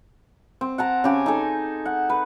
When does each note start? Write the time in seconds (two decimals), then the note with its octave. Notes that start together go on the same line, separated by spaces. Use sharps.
0.61 C4
0.78 F#5 A5 A#5
1.04 C#3 G4 G#5
1.26 D#4 A4 G#5
1.85 F#5
2.09 B4